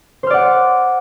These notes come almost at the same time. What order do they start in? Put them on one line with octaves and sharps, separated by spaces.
C5 F6 D5 F#5